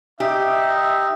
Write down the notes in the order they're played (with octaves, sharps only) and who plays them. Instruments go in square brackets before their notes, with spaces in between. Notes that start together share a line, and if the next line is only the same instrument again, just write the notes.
[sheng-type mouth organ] D#4 [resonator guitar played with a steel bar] G4 [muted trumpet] E5